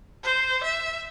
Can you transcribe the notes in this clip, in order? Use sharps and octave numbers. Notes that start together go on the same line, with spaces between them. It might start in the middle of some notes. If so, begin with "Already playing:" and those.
C5
E5